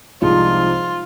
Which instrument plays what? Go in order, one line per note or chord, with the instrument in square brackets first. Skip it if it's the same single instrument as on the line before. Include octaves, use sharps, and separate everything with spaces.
[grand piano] C2 C3 F3 G#3 D#4 [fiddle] F4